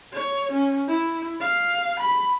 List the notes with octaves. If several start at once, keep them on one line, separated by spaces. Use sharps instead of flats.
C#5
C#4
E4
F5
B5